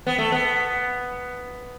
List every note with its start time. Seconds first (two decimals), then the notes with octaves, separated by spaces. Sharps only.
0.07 B3
0.18 A3
0.32 B3